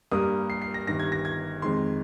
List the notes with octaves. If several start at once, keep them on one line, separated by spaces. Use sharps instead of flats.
G2 G3 A#3 D#6
C7
C7
A#6
G1 G2 D#3 A#6
G#6
A#6
G#6
F2 D#3 G#3 C6